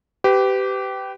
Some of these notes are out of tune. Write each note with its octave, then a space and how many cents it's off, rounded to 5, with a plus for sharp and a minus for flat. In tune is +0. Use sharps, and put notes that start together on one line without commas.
G4 -15 B4 +30